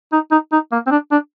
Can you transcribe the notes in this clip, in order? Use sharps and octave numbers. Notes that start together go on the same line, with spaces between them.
D#4
D#4
D#4
A#3
C4
D4
D4